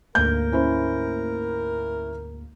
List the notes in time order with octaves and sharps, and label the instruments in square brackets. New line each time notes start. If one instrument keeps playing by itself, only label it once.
[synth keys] D2 G#2 A#3 [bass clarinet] A#4 [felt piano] G6
[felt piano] C#4 E4 C5